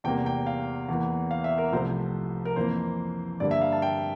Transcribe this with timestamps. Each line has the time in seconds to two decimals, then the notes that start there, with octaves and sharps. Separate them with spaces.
0.04 E2 C3 G3 A#3 G5
0.26 G5
0.47 F5
0.89 E2 E3 A#3
1.31 F5
1.44 E5
1.58 A#4
1.72 C2 C3 F3 A3 C5
2.45 A#4
2.56 F2 E3 A#3 C5
3.40 G2 D3 G3 A#3 D5
3.51 E5
3.61 F5
3.72 A5
3.82 G5